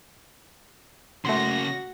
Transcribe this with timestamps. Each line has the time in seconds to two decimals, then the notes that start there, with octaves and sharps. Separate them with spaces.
1.25 C#3 A3 A#3 F#4 C6 A#6